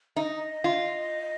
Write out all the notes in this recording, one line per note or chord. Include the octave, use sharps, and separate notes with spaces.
D#4 D#5 E5
F4